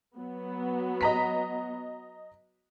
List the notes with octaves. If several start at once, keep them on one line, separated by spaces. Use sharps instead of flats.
F#3 B3
D#5 A#5 B6